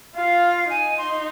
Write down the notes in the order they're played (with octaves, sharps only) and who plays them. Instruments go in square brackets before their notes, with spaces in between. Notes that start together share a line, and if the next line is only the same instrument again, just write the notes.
[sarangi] F4 [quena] F5
[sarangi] D#4 [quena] G#5
[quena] C6